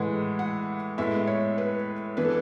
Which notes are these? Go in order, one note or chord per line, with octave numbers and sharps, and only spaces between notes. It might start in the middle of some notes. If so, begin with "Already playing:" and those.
Already playing: A2 E3 G#3 F#5
F#5
A2 G#3 B3 E5
C#5
B4
E3 B3 D4 B4
A4